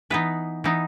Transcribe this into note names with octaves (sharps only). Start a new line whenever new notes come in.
E3 B3 D#4 B4
E3 B3 D#4